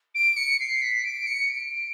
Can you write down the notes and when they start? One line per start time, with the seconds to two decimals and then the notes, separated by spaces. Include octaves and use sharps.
0.15 D7
0.37 C#7
0.60 C7
0.82 B6
1.04 D7
1.26 C#7
1.49 D7